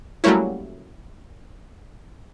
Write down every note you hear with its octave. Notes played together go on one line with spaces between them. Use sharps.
F#3 G3 A3 A#3 C#4 E4